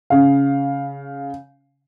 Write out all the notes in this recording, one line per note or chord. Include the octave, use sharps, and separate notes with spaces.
C#3 F5